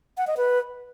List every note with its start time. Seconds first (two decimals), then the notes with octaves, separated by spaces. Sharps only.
0.17 F#5
0.27 D#5
0.37 B4